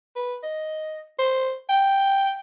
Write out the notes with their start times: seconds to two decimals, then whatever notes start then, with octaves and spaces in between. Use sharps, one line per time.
0.16 B4
0.44 D#5
1.19 C5
1.69 G5